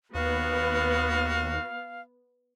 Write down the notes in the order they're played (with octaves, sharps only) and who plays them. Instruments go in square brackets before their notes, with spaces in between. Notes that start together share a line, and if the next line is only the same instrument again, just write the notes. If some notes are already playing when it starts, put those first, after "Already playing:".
[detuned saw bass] D#2 [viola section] B3 [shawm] F#4 [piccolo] F5